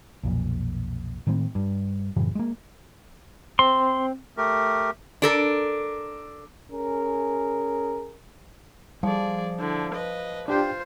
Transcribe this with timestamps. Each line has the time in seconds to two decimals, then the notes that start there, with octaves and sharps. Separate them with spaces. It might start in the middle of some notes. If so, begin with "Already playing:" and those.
0.23 B1 F2 A#2
1.27 A2 D#3 G#3 C4
1.55 G2
2.16 F#2 A2 C#3 E3
2.35 G#3 A#3
3.59 C4 C6
4.37 A3 G4 A#4
5.22 D4 A4 A#4
6.72 C#4 G#4 A#4
9.03 F3 G3 G#4 D5
9.60 D3 E4
9.94 B4 D#5
10.48 D4 F4 G4 C5 G5